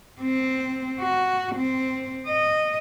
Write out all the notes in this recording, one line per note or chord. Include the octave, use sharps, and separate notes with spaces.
C4
F#4
C4
D#5